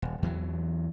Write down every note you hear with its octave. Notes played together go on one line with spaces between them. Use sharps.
D#1
E2 E3 F#3